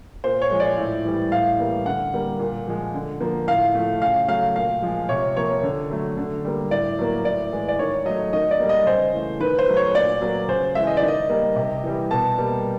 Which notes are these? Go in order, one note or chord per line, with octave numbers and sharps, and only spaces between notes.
A#2 C5
C#5
F3 G#3
D5
A2
E3 G3
A2 F5
E3 G3 A#3
D3 F#5
G3 A#3
A#2
F3 G#3
D3
F3 A#3
A2 F5
F3 A3
C#3 F5
F#3 A3 F5
A#2 F5
F3 G#3
C3 C#5
F3 A#3 C#5
D3
F#3 A3
D3
G3 A#3
A2 D5
F#3 A#3
A2 D5
E3 G#3
D5
D#3 C#5
F#3 A3 D#5
D#3 D#5
D5
G3 A#3
D#5
C#3 C5
E3 A3
D#3 B4
C5
F#3 A3
C#5
A#2 D5
F#3 A#3
C#3 C5
E3 G#3 E5
D#5
D5
D#3
D#5
G3 A#3
C3
E3 G3
B2 A5
G3 A#3